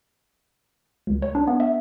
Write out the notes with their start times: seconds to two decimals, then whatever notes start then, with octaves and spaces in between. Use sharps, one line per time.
1.07 C#2
1.22 C#5
1.35 D4
1.47 B3
1.60 E5